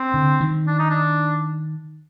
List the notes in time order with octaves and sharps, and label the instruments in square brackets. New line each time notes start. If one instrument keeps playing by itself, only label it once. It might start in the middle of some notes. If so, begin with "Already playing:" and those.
Already playing: [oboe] C4
[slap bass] D3
D#3
[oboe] D4
D#4
D4